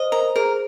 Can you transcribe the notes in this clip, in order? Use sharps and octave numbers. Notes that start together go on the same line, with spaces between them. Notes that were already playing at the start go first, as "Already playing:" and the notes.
Already playing: C5 D#5
A#4 A#5
G#4 A#4